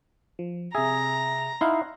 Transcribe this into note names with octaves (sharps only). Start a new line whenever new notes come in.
F3
C3 G#4 E5 A#5
D#4 E4 F5 F#5 C6